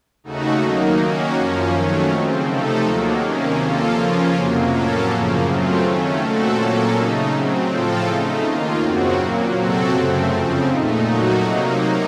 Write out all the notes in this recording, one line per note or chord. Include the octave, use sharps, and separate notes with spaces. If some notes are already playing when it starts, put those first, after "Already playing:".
D#2 C#3 A3 D#4 F#4
D#3 F#3 A#3 D#4
D#3 A#3 C#4 F#4
F#2 F3 A#3 C#4
D#3 F#3 A3 C#4
C#3 F3 C4
C3 F3 A3 D#4 A4
D#2 D#3 F#3 A#3
C3 D#3 A#3 C#4
F3 A#3 F4 A4
C#3 F3 A#3 C#4 F4
F2 C3 F#3 A#3
A2 F#3 A#3 C#4 A4
F#2 C#3 F3 A#3
C#3 F#3 A3 C4 F4
D#3 A3 C#4
A#2 A3 C4 F#4 A4
A#2 F#3 A#3 C#4 A4
C#3 A3 D#4
C#3 F#3 C4
A2 F3 C4 F4 A4
C#3 A3 D#4
D#2 D#3 A#3 F4
F#2 C#3 F#3 C4 F#4
A#2 F#3 A#3
C3 F#3 C4 F#4 A4
F#2 C#3 A3 C4
F2 C#3 F3 C4
A#2 A3 D#4
A#2 F#3 A3 D#4 F#4
C3 F#3 A#3 D#4